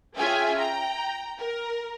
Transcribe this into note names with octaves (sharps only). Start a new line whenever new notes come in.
C#4 F4 G#4 E5 G5 G#5
G5 A#5
A#4